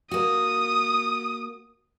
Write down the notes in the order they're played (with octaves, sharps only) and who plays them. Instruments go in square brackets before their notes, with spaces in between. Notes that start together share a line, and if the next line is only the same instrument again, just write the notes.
[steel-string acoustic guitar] A#3 F#4 [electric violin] D#6